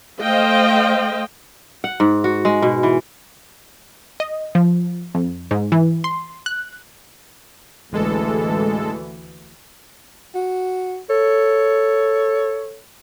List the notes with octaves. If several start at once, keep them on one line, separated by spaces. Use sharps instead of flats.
A3 C5 D#5 F5 G5
F#5
G#2
F#4
G#3
B2
E3
D#5
F3
F2
G#2
E3
C6
F#6
A1 D2 E3 G#3 A4
F#4
A4 C#5